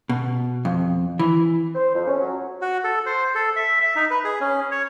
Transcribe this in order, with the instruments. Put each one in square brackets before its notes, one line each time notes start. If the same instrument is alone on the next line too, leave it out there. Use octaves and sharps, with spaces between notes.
[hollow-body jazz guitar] B2
F2
E3
[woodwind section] C5
F2
C#4
F#3
[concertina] F#4
A4
C5
A4
E5
E5
D#4
B4
G#4
C#4
C#5